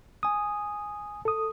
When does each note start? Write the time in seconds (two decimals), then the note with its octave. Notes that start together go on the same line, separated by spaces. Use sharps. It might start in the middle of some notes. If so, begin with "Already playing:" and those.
0.23 G#5 D#6
1.25 A4 D#6